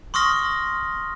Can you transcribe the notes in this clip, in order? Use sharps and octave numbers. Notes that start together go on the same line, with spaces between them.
C6 C#6 D#6 F6 A#6 G7